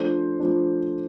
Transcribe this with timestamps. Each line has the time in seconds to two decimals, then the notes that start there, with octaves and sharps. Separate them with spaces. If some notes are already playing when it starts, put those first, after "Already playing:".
Already playing: F3 A3 D4 C5
0.40 F3 A3 D4